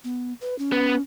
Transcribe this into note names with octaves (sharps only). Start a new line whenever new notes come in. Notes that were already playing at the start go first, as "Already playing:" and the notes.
B3
B4
C#4
B3